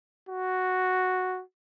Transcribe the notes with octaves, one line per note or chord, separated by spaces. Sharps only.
F#4